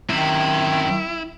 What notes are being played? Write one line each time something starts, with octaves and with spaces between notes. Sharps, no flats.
F#2 C3 D#3 E4